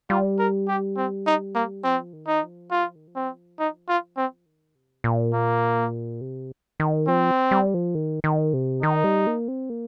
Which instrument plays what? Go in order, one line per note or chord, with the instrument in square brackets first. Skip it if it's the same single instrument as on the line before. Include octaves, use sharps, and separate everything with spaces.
[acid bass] G3 [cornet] F4
[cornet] A#4
G4
C4
D#4
A#3
[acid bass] F3 [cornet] C4
[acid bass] D#3
[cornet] D#4
[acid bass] F3
[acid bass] G3 [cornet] F4
[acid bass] F3
D#3
F3
[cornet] C4
D#4
F4
C4
[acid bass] D#3
C3
A#2
[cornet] A#3
[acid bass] C3
D#3
[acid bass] F3 [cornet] C4
[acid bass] G3
F3
D#3
D#3
C3
[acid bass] D#3 [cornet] D#4
[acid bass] G3
A#3
C4
A#3